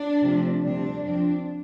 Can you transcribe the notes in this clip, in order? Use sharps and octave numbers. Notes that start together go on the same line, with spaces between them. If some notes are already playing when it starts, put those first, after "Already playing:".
Already playing: D4
C3 F3 A3 C4
D2 C3 G3 C4 D4
F2 F3 C4 D4